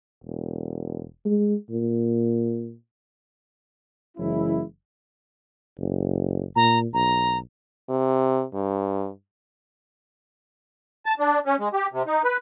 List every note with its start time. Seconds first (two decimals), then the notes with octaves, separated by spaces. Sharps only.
0.24 E1
1.25 G#3
1.70 A#2
4.18 F#1 E3 G#3 C#4 E4
5.79 F#1
6.56 A#2 A#5
6.94 B1 A#5
7.89 C3
8.54 G2
11.06 A5
11.20 D4
11.46 C#4
11.59 G#3
11.74 G4
11.92 C3
12.07 D#4
12.24 B4